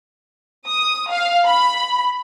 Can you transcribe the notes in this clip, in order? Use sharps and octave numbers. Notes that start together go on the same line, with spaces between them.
D#6
F5
B5